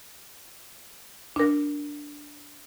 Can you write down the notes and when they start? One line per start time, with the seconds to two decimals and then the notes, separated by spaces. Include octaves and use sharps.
1.36 D4 A#4